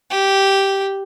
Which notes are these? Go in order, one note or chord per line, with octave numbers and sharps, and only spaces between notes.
G4